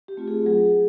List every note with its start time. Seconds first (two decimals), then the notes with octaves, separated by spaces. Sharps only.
0.08 G4
0.17 A3 C4 F4
0.28 G#4
0.46 F#3 G#4